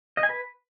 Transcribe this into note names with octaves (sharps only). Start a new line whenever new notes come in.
D#5
G#5
B4